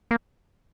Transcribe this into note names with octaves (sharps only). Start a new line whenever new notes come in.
A#3